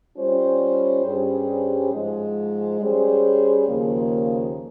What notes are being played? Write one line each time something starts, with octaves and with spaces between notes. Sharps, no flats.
G3 C#4 F4 C5
G2 G3 C#4 G#4 C5
G#2 F3 G#3
G3 C#4 G#4 C5
D#2 C#3 F3 A#3